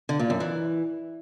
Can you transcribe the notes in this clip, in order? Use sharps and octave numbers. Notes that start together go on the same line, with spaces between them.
D3
A#2
F#2
E3